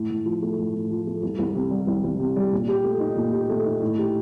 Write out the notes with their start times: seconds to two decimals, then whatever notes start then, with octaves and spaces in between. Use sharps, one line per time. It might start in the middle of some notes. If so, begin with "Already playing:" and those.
Already playing: A2
0.10 A2
0.26 F3
0.42 A3
0.58 A2
0.74 A2
0.91 F3
1.07 A3
1.23 C2
1.39 C2
1.55 C3
1.71 G3
1.87 C2
2.04 C2
2.20 C3
2.36 G3
2.52 A#2
2.68 G4
2.84 A3
3.00 D#4
3.17 A#2
3.33 G4
3.50 A3
3.66 D#4
3.81 A2
3.98 G4